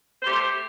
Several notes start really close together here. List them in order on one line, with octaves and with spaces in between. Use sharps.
C5 G4 A3